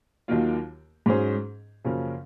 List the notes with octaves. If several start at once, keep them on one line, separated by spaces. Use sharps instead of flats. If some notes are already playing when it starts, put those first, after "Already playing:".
D#2 D#3 F#3 A#3 F4
G#2 F#3 C#4 G#4 C5
F#2 C#3 F3 A#3 C#4